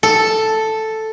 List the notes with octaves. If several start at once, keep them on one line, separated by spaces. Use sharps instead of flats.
A4